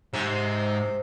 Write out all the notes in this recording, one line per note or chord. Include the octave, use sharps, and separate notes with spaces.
G#2 C3